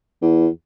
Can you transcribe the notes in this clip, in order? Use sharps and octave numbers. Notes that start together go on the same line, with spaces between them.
E2